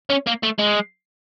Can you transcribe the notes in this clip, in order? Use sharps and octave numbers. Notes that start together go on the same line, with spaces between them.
C#4
A#3
A3
G#3